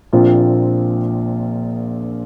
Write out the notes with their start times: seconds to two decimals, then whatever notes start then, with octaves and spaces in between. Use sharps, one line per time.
0.13 A#1 A#2 F3 C4 F4